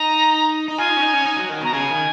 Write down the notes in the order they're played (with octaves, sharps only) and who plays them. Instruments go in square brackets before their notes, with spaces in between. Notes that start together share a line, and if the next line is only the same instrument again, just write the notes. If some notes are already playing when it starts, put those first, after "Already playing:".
Already playing: [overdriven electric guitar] D#4 [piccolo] A#5
[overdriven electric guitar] D#4
[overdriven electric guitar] F4 [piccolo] G#5
[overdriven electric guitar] D#4
C#4
D#4
C#4
D#4
F#3
D#3
[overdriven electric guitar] B2 [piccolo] A#5
[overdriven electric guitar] C#3 [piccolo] G#5
[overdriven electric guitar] D#3